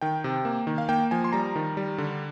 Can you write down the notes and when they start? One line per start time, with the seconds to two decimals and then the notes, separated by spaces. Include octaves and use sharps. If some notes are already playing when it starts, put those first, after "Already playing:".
0.01 D#3 G5
0.24 C3
0.45 A#3
0.67 D#3
0.78 F5
0.89 A#3 G5
1.11 F3 G#5
1.24 C6
1.33 G3 A#5
1.56 D#3
1.77 G3
1.98 D3